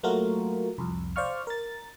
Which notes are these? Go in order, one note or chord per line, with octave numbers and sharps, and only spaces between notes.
F#3 A3 A#3 F4 F#4 A#4
C2 F2
C5 D5 F5 C#6 F6
A#4 A6